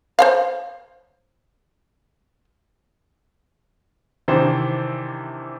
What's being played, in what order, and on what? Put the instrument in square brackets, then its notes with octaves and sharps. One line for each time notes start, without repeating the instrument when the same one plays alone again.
[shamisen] C5 C#5 F5
[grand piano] C3 D#3 E3 D4 C5